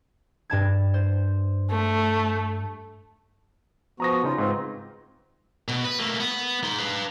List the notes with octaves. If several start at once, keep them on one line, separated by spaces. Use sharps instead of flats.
G2 A5 G#6
C5
A3
F3 B3 F#4 A#5 D#6 A#6
C#3 D#4 F4
G#2 C4 F4 B4
B2
B4
A3 A#3
B3
D#4 C6
B4 F5